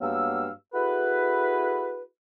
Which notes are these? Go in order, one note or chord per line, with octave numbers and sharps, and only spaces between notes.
G2 F#3 A#3 B3 F5 E6
E4 F#4 G#4 A4 B4